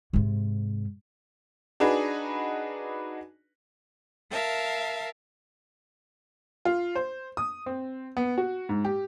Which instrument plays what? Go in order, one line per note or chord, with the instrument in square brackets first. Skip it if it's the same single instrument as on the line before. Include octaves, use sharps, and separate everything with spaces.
[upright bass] G#2 C3
[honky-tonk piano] D4 D#4 F#4 G#4 B4
[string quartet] A#4 E5 F5 A5
[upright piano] F4
C5
D#6
C4
B3
F#4
G#2
G4